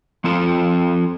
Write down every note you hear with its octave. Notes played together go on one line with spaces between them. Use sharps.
F3 C4 F4 A4